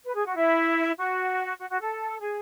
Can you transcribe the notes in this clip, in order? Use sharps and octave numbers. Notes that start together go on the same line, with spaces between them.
B4
G#4
F#4
E4
F#4
F#4
F#4
A4
G#4